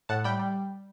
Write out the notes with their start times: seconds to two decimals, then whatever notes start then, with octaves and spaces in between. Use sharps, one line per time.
0.09 A2 F#5 A5
0.24 G3 G5 B5
0.39 G3